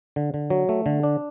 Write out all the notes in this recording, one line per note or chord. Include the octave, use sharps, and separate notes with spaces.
D3
D3
F#3
A3
D3
D4